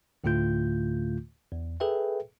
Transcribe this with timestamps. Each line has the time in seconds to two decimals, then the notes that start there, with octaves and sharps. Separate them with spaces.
0.24 D2 A2 D3 A3 F4 G6
1.52 E2
1.80 G#4 A4 B4 E5 G5